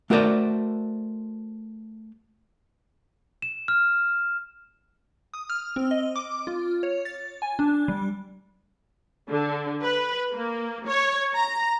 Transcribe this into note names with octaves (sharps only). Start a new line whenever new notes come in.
A3 F#4 A#4 C5 D5
E7
F6
D#6
F6
C4
D#5
D6
F4
C#5
A6
G#5
D4
G3
D3
B4
A#3
C#5
A#5